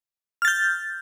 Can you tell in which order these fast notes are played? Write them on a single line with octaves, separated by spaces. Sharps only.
F6 A6 G6